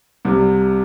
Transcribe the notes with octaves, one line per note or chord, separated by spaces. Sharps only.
C2 C3 G3